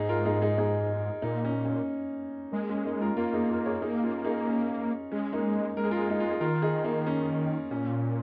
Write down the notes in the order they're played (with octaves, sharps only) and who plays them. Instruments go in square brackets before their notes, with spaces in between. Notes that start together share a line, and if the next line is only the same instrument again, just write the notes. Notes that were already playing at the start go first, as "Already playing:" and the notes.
Already playing: [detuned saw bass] G#2 [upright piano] D#4 G#4
[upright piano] F4 A#4
D#4 G#4
D#4 G#4
D#4 G#4
[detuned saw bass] A#2 [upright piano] A#3 D#4
[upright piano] C#4
C#4
[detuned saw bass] G#3 [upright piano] A#3
[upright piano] C#4
A#3 D#4
F4 A#4
[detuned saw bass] A#3 [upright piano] F4 A#4
[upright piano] D#4 G#4
F4 A#4
G#4 C#5
D#4 G#4
C#4 F4
D#4 G#4
C#4
[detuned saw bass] G#3 [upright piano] C#4
[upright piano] A#3 D#4
[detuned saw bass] G#3 [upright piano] A#4
[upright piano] G#4
F4 A#4
D#4
F4
G#4
[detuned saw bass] D#3 [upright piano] F4 A#4
[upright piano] D#4 G#4
A#3 D#4
C#4
[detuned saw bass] A#2 [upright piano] C#4